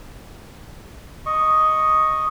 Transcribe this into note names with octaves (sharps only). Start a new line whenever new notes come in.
D#5 C#6